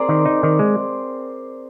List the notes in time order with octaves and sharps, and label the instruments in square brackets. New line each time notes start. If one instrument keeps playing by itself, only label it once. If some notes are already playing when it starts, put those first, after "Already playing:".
Already playing: [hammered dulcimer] C4 G#4 A#4 C5 D5
[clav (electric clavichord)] D#3
D#4
D#3
G#3